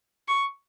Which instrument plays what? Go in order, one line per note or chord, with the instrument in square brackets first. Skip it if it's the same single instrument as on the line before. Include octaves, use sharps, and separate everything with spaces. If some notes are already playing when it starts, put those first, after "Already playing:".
[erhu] C#6